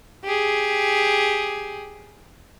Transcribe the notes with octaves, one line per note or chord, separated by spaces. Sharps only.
G4 G#4